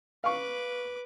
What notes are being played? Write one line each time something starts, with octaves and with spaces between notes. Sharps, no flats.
B4 F5 C#6 D6